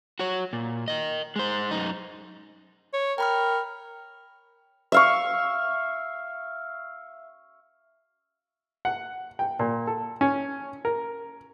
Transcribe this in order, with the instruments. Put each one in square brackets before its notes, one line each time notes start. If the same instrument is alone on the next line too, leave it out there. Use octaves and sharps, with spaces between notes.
[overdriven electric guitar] F#4 C#5
A#2
A#4 D#5
G#3 C5
F#2 D#4
[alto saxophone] C#5
[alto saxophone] A#4 [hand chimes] G5 B5 F6
[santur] E5 F5 C#6
[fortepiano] F#5
G5
A#2
A4
C#4
A#4